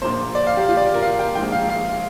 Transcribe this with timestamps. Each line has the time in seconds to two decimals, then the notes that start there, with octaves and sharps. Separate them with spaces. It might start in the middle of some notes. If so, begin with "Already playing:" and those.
0.02 A#1 A#2 F3 A#3 C5
0.35 D5
0.47 F5
0.57 G4
0.69 F4
0.77 D5
0.94 A#4
1.02 F5
1.19 G5
1.35 A#1 G#2 F3 A#3 G5
1.52 F5
1.69 F5